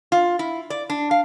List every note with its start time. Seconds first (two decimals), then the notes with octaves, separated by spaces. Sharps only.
0.12 F4
0.39 E4
0.70 D5
0.90 D4
1.11 F5